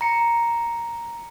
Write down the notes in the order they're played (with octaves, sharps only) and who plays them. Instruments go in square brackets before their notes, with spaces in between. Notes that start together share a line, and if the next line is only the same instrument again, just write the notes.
[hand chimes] A#5 C#7